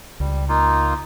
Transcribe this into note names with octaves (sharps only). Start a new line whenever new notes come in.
C#2 G3
A#3 D#4 F4